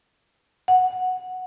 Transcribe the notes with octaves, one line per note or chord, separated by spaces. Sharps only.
F#5